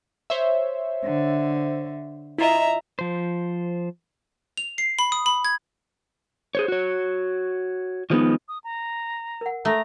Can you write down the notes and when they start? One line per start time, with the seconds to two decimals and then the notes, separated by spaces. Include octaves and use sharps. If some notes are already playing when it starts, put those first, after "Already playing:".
0.30 C5 C#5 E5
1.06 D3
2.38 E4 F4 D#5 E5 A#5
2.99 F3 C5
4.57 F7
4.78 C7
4.99 B5
5.12 D#6
5.26 B5
5.45 G#6
6.55 G#4 C5 C#5
6.68 F#4 C#5
8.10 D#3 F3 G#3 B3 D#4
8.48 D#6
8.64 A#5
9.41 A#4 F#5
9.65 A3 A4 A#5